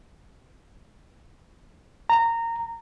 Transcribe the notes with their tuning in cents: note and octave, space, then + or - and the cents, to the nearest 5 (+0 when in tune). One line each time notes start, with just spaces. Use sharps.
A#5 -20